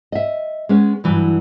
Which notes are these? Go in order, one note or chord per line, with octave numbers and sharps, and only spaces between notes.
D#5 E5
G#3 B3 C#4
G2 E3 F#3